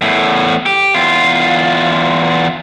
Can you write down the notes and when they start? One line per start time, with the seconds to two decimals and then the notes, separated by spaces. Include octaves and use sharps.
0.02 E2 A2
0.66 G4
0.94 E2 F4